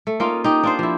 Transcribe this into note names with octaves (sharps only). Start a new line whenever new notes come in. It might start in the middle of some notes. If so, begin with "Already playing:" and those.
A3
A#3 C#4 D#4 F4
D#4 G4
D4 F4 C5
F3 E4